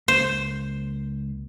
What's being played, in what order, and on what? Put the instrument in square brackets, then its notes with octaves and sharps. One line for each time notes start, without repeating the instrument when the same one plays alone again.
[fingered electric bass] C#2 A#3 [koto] C5